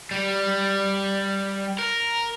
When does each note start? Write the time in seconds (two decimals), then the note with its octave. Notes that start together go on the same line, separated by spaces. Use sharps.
0.11 G3
1.79 A#4